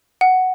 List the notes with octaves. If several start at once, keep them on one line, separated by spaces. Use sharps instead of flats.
F#5